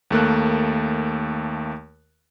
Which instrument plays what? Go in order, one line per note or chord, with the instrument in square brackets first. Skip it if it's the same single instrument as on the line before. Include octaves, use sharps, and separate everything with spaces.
[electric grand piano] D#2 A3 A#3 F#6